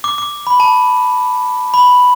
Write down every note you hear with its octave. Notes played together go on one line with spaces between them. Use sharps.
D6
D6
B5
A5
B5